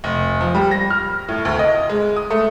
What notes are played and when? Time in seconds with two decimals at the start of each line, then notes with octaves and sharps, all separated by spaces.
0.04 F1
0.41 F3
0.55 G3
0.71 A#6
0.90 F6
1.28 A2
1.45 D2
1.59 D#5
1.89 G#3
2.17 D#6
2.30 A3